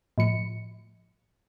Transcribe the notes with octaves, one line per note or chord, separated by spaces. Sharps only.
A2 F3 C#7